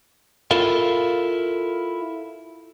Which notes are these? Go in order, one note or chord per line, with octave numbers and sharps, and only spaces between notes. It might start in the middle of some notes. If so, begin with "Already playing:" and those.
E4 F4 A4 A#4 F5